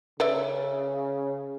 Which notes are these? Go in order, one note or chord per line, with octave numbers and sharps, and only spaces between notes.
C#3 B4 D5 E5